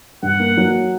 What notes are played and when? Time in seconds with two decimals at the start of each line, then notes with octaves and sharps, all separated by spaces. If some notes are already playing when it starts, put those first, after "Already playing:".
0.23 G2 F#5
0.40 A#3
0.57 F#3